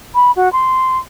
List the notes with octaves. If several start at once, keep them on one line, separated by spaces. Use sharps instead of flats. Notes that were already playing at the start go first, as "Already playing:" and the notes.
B5
F#4
C6